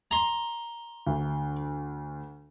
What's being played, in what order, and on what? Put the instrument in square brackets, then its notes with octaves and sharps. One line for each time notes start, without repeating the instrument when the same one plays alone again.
[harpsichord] A#5 C6
[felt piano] D2